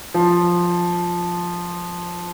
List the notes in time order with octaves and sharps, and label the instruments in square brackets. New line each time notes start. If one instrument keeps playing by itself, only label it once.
[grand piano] F3